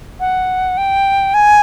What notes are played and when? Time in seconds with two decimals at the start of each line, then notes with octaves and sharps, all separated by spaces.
0.20 F#5
0.78 G5
1.34 G#5